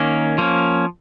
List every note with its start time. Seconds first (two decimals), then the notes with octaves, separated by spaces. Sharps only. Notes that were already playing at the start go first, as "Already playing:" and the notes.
Already playing: D#3 A#3 C#4 A#4
0.38 F3 A#3 C#4